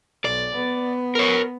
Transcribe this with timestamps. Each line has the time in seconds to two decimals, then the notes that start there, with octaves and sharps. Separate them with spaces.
0.25 B1 D5
0.55 B3
1.15 A#4 C#5